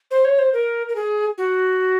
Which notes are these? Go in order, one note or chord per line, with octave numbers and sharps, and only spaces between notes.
C5
C#5
C5
A#4
A#4
G#4
F#4